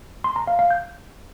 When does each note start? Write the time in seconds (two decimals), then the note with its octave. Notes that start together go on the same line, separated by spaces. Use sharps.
0.24 C6
0.36 A#5
0.47 F5
0.59 F5
0.71 G6